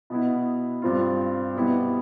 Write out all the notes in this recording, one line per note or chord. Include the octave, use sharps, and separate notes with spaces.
B2 B3 E4
G2 F3 C4 F4
B2 G3 B3 E4